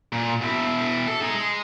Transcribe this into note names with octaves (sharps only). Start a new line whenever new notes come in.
A#2
B2 E4
A4
D#4 G#4
G#3